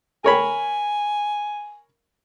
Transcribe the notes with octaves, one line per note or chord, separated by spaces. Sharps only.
A#4 C#5 G#5 B5